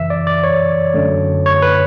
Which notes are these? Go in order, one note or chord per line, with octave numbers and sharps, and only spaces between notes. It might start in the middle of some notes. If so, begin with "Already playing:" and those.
Already playing: F#2 C#3 E3 E5
D5
D5
C#5
F#2 D3 A3
C#5
B4